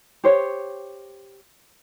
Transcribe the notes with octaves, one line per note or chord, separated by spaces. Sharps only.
G4 C5 C#5